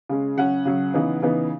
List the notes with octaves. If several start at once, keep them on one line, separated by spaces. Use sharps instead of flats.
C#3 G#3 C#4
C#3 F#3 C#4 F#5
C#3 F#3 C#4
C#3 E3 B3 D#4
C#3 E3 B3 D#4